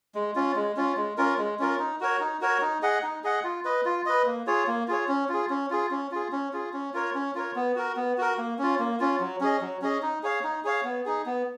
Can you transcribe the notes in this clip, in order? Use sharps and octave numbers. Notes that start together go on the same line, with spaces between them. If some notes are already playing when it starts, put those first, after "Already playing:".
G#3
C#4 F4
G#3
C#4 F4
G#3
C#4 F4 A#4
G#3
C#4 F4 A#4
D#4
F#4 A#4 C#5
D#4
F#4 A#4 C#5
D#4
G#4 D#5 F#5
D#4
G#4 D#5 F#5
F4
B4 D#5
F4
B4 D#5
A#3
F4 G#4 C#5
A#3
F4 G#4 C#5
C#4
F4 G#4
C#4
F4 G#4
C#4
F4 G#4
C#4
F4 G#4
C#4
F4 A#4 C#5
C#4
F4 A#4 C#5
B3
F#4 A#4
B3
F#4 A#4
A#3
C#4 F4
A#3
C#4 F4
F#3
C#4 G#4 D#5
F#3
C#4 G#4 D#5
D#4
G#4 C#5 F5
D#4
G#4 C#5 F5
B3
D#4 G#4
B3